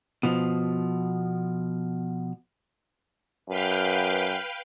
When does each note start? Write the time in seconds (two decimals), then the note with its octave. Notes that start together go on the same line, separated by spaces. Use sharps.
0.23 B2 F3
3.49 F#2 B4 F5 G5